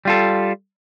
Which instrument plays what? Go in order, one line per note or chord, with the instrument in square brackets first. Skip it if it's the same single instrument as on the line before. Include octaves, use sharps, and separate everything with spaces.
[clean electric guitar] G3 F4 A4